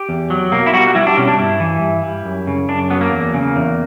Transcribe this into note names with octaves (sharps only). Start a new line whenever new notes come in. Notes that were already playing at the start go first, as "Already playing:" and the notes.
Already playing: G4
E2
F#3
B2 A#3
E4
G3 F#4
F#4
G3 E4
D4
B2 C#4
D4
G2 E4
E3
G2
G3
F#2
C#3
F#2 D4
F#3 B3
A#3
E2
C#3
E2